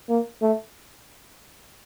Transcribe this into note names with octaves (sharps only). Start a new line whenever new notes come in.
A#3
A3